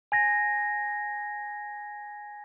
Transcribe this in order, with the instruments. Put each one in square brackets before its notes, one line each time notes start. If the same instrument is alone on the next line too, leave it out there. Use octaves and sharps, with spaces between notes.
[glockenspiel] G#5 G#6 A#6